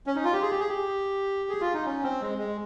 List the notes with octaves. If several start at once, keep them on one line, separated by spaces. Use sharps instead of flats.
C#4
D#4
F4
G4
G#4
G4
G#4
G4
G#4
F4
D#4
C#4
C4
G#3
G#3